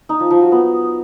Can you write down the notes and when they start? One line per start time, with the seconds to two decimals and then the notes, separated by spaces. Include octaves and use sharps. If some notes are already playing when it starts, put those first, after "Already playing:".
0.09 D#4
0.20 F3
0.31 F3
0.41 F#3
0.52 B3